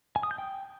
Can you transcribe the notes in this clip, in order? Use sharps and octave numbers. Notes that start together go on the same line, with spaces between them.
G#5
D#6
G6
G5